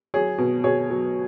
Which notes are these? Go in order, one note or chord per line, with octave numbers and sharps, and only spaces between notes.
F#3 G#4 C#5
B2
B2 G#4 C#5
F#3